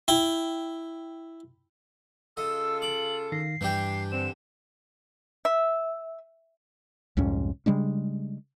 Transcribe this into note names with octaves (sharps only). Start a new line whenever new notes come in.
E4 G5
C#3 F4 A4 D#5 E6
D6 F#7
D#3 F5 A#6 C7
G2 E3 D4 G4
D3 C4 E7
E5
C2 F2 G#2 C#4
C#3 G3 G#3 D4